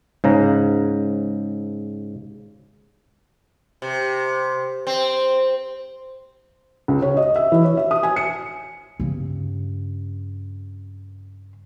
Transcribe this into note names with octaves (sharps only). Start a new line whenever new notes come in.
G#2 C#3 A#5
C3
C4
C#2
C#5
D#5
E5
E3
C#5
E5
D#6
G#5
C#7
G2 C#3